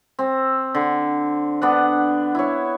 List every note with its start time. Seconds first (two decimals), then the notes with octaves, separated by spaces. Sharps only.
0.19 C4
0.74 D3
1.62 B3 D4 F#5
2.35 E4 C#5